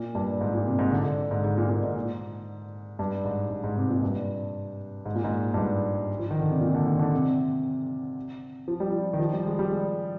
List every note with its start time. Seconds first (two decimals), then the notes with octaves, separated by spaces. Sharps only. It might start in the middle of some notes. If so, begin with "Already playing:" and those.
Already playing: A#2
0.15 G2
0.41 G#2
0.54 A#2
0.67 C3
0.79 G#2
0.92 D3
1.06 D3
1.31 G#2
1.44 G#2
1.58 A#2
1.69 A#2
1.83 G#2
2.99 G2
3.25 G#2
3.50 G#2
3.64 G#2
3.77 C3
3.90 A#2
4.03 G2
5.06 G#2
5.15 A#2
5.24 G#2
5.54 G2
5.57 G#2
6.19 F3
6.31 D#3
6.40 D3
6.51 C3
6.61 A#2
6.75 D3
6.86 D#3
6.99 D3
7.13 C3
8.68 F3
8.80 G3
8.92 F3
9.13 D#3
9.19 F3
9.33 G3
9.46 G#3
9.59 G3
9.72 G#3